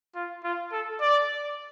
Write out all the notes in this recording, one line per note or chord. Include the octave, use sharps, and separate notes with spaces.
F4
F4
A4
D5